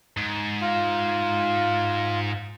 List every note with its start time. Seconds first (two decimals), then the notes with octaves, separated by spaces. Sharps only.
0.17 G#2
0.61 F4